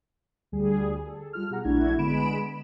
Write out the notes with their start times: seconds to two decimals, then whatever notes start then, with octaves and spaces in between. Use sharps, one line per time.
0.52 D2 G3 G#4
1.07 A4
1.33 G3 F4 F6
1.50 B2 G4 G#4 F#5 A#5
1.65 A#1 A3 D4 E4 F#4 G#6
1.98 D3 G#3 B3 B5 D7 E7